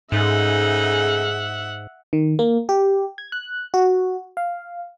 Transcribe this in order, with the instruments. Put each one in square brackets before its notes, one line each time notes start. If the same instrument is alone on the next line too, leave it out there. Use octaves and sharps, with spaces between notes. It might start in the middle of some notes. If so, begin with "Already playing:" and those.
[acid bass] G#2 [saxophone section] C#3 A3 D#4 [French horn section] G#4 [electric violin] E5 F#5
[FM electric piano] D#3
A#3
G4
G#6
F#6
F#4
F5